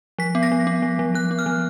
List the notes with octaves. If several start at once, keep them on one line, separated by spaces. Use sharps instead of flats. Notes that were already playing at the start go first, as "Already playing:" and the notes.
F3 B6
B3
A#6
F3
B3
F3
F3
F3 F#6
B3
F6
F3